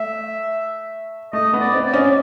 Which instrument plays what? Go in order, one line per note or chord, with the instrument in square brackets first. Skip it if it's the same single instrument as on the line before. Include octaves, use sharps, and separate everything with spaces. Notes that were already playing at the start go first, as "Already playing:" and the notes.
Already playing: [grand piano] A3 [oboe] E5
[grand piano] A3 [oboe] D#5
[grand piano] B3
[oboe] D5
[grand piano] C4
[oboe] D5
[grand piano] C#4 [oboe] D#5
[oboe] D5